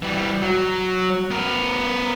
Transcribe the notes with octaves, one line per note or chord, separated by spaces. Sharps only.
E3 G3
F#3
B3 A#4